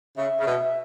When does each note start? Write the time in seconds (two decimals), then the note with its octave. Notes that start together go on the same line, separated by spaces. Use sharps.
0.17 C#3 E5
0.40 C#3
0.46 B2